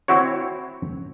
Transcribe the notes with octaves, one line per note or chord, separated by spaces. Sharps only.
C4 E4 F#4 C#5